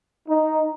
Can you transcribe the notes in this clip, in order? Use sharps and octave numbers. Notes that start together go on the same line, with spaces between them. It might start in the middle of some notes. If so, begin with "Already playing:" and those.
D#4